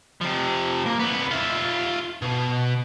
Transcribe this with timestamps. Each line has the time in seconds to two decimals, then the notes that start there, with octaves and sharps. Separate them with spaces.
0.21 C3 F3
0.86 A#3
1.00 C2 B3
1.31 F4 E5
2.22 B2